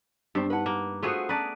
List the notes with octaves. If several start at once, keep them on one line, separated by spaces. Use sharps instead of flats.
G2 B3 C4 D4 C5
D#4 E4 B4 F#5 A5
A#3
A3 B3 F4 F#4 G#4 C5
C#4 B4 D5 A5 A#5